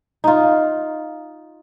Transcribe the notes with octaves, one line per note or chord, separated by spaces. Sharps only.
D#4 F4